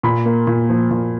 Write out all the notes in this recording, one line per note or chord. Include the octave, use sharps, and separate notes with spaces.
A#2 B5
A#3
A#2
F3
A#2